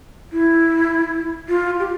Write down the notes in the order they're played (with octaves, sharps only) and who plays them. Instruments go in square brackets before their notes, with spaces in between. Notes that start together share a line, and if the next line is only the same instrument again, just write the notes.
[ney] E4
F4
G4